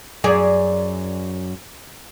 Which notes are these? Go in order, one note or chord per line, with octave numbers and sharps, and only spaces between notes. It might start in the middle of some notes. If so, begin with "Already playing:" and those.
F#2 G#4 D5